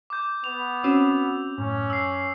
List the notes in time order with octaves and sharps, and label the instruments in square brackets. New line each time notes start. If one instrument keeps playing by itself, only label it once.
[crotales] D6 G6
[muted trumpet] B3 [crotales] F7
[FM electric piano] C4 C#4 F#4 [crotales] E6
[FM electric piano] F#2 A2 [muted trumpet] C#4
[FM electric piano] F#2 [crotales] E6 C7